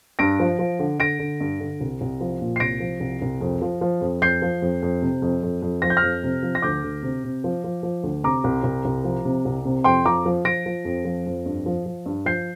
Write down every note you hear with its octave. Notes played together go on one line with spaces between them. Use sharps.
G2 A#6 D7
F3
F3
D3
D3 A#6 D7
D3
G2
D3
C2
C2
F3
A#2
C7
C2 A#6 D7
F3
C2
C2
F2
F3
F3
F2
F2 G6 C7
F3
F2
F2
C3
F2
F2
F2
F3 A#6
G6
F6 A#6
F2
C3
F3
A#6
D2 D6 G6
D2
C3
C3
F3
F3
F3
D2
C3 A#5 D6
C2
C2
C2
F3
C3
C2
C3
F2 G5 C6
F3 A#5 D6
F3
F3 A#6 D7
F3
F2
F3
F2
G2
F3
F3
G2
F3 G6 C7